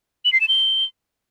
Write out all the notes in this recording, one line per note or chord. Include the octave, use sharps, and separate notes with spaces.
F#7
C7
E7
G7